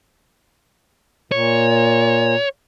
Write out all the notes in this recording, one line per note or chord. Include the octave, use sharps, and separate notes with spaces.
A#2 C#5